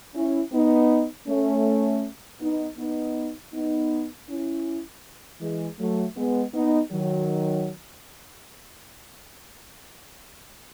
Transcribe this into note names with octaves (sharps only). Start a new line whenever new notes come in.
C#4 E4
B3 D#4
A3 C#4
B3 D#4
B3 D#4
B3 D#4
C#4 E4
E3 G#3
F#3 A3
G#3 B3
B3 D#4
D#3 F#3